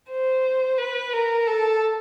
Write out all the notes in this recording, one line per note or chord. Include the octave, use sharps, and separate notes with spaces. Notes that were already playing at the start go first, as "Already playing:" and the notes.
C5
B4
A#4
A4